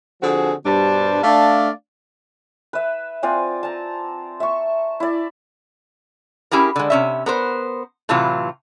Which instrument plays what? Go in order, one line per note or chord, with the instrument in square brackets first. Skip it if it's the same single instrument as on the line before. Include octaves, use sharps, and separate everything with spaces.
[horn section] D3 F3 C4 F#4 G#4
G2 B2 G3 D4 C5 A5
A3 D4 D5 F5
[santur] B4 E5
C4 F4 D5 G#5
A5 A#5
E5 C#6
E4 D5
[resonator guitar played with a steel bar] C#4 E4 G4 G#4 A#4
D3 G#3
C3 C#4 E5
B3 A#4 C5
A2 C3 E3 F#3 F4